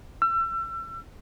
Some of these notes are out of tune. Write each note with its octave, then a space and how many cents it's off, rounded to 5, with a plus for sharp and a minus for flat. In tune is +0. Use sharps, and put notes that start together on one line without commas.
E6 +35